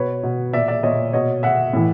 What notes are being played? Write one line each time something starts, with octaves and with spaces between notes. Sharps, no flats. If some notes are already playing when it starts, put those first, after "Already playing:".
Already playing: B2 B4 C#5
B2
A#2 D5 E5
D5 E5
A#2 C#5 D#5
B2 C#5 D#5
B2 E5 F#5
A2 E3